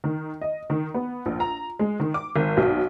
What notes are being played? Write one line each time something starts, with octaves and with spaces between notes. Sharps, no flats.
D#3
D#5
D#3
B3
A#1
A#5
G#3
D#3
D6
G#1
B1